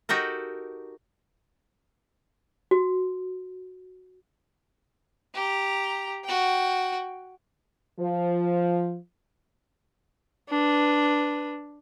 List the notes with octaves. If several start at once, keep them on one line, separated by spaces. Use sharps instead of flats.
D#4 F#4 G4 A4 A#4
F#4
G4 A#5
F#4 G5
F3
D4 B4